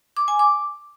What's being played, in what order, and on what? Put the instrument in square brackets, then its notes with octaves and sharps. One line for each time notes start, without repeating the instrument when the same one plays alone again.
[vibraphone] D6
G#5
D6